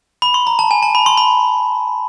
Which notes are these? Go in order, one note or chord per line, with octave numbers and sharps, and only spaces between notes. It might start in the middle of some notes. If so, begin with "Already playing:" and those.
B5
C6
A#5
A5
G#5
A5
B5
C6
B5